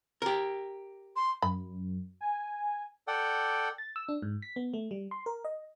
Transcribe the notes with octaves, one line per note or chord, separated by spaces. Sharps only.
G4 A#4
C6
F#2 B5
G#5
A4 D5 F#5 G5
A6
E6
D4
G#2
B6
B3
A3
G3
C6
A#4
D#5